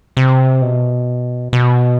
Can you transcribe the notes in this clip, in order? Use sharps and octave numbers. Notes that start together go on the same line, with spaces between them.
C3
B2
B2